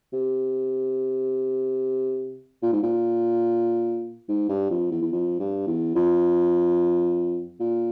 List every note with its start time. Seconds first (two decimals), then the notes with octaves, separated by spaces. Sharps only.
0.13 C3
2.63 A#2
2.73 G#2
2.83 A#2
4.29 G#2
4.49 G2
4.70 F2
4.91 E2
5.02 E2
5.12 F2
5.39 G2
5.67 E2
5.95 F2
7.60 A#2